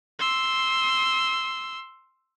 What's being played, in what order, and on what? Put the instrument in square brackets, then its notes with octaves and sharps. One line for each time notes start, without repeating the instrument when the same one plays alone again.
[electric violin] C6 E6